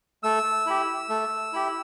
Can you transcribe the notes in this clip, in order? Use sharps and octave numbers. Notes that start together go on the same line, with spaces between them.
A3 E6
E4 G4
A3
E4 G4